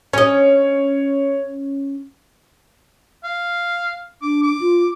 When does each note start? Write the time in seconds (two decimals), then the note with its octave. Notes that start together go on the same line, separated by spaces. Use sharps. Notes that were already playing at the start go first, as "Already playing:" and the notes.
0.13 C#4 C#5 D#5
3.24 F5
4.22 D4 D6
4.43 D6
4.60 F4